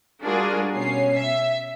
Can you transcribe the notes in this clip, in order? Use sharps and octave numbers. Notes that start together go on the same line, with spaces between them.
G3 D4 F4 F#4 G#4 A#4
B2 C#4 C7
E5